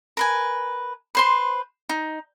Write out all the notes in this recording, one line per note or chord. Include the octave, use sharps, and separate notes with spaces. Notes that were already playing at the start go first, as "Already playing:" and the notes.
A#4 B4 G#5
B4 C5 C6
D#4